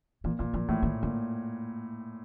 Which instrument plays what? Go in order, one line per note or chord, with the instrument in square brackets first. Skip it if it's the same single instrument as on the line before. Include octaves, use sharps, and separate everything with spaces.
[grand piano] A#2 [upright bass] E3
[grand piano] A#2 [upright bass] E3
[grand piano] A#2 [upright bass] F3
[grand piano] A2 [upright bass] E3
[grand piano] A2 [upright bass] D#3
[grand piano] A#2 [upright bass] D3